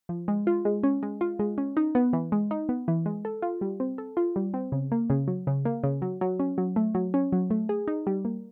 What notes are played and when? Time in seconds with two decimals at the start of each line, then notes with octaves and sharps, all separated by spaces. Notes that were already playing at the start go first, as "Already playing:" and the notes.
0.09 F3
0.28 G#3
0.47 F4
0.65 G#3
0.83 C#4
1.03 G#3
1.21 F4
1.39 G#3
1.58 C#4
1.77 D#4
1.95 B3
2.13 E3
2.32 G#3
2.51 D#4
2.69 B3
2.88 E3
3.06 G#3
3.25 A4
3.42 F4
3.61 G3
3.80 C4
3.98 A4
4.17 F4
4.36 G3
4.54 C4
4.72 C#3
4.92 A#3
5.10 C#3
5.28 F#3
5.47 C#3
5.65 A#3
5.83 C#3
6.02 F#3
6.21 F#3
6.40 C#4
6.58 F#3
6.76 A3
6.95 F#3
7.14 C#4
7.32 F#3
7.50 A3
7.69 G#4
7.88 D#4
8.07 G3
8.25 A#3